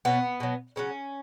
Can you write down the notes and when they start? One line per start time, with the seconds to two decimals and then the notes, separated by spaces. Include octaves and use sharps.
0.05 B2 F#3 B3
0.40 B2 F#3
0.76 C#3 F#3 C#4